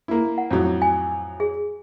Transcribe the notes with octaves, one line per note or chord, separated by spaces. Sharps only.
A#3 E4
F#5
F2 A2 F#3
G#5
G#4